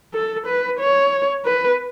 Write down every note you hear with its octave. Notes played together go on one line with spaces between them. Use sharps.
A4
B4
C#5
B4